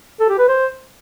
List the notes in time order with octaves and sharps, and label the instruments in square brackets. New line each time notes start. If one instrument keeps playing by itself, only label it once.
[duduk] A4
G4
B4
C5